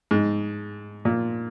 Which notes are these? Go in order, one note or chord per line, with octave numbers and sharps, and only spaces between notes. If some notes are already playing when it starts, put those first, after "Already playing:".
G#2
A#2